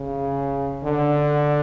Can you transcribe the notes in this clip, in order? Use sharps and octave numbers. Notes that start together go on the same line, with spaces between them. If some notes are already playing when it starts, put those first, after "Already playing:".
Already playing: C#3
D3